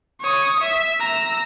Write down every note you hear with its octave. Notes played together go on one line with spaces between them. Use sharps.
C#5 D#6
E5
A#5 E6